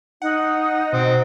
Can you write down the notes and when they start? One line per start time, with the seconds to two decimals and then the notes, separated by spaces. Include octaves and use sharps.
0.22 D#4 F#5
0.93 B2 C4